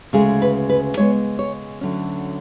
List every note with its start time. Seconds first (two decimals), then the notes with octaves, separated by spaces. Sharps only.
0.13 D2 C#3 G#3 G#4
0.42 B4
0.70 B4
0.97 C#3 G#3 B3 C#5
1.39 C#5
1.81 D2 D3 F#3 C#4